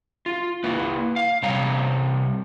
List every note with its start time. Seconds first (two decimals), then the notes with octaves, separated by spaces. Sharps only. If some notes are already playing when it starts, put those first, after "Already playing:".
0.26 F4
0.64 A#3 E4 B4
1.16 F5
1.42 C3 G3 C#5 A#5